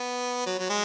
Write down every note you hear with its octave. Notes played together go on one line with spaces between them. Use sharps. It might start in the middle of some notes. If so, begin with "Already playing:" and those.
Already playing: B3
F#3
F#3
G#3